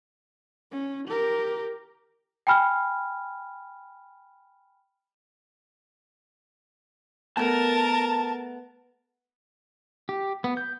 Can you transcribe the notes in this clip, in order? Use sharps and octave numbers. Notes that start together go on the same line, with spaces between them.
C#4
G4 A#4
G5 G#5 B5 F6
A3 B3 A#4 A5 A6
G4
B3
G6